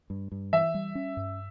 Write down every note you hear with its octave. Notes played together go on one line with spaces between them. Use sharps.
G2
G2
E3 E5
G3
C#4
G2